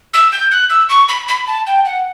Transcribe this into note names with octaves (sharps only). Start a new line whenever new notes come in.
E6
G6
F#6
E6
C#6
B5
B5
A5
G5
F#5